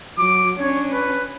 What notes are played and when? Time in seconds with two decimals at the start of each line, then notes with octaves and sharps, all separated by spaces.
0.18 F#3 D6
0.58 C#4 D4 C#5
0.92 B4